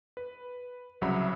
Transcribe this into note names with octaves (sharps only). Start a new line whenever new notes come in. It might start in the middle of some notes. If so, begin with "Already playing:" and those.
B4
C2 C#3 F#3 C#5 E5 B5